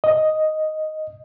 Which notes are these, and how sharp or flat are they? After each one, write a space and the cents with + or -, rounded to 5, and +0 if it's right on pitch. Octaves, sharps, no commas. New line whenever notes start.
D#5 +0